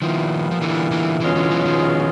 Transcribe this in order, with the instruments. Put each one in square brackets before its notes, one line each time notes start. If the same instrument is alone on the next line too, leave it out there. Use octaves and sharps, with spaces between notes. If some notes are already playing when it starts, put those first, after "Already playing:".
[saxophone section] A#2 G3 B3 E4 [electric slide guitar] D#3 F3
[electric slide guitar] F3
D3 E3
D3 E3
[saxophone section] E2 B2 G#3 C#4 F4 [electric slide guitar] D3 E3
[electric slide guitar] D3 E3
E3 F#3
D#3 F3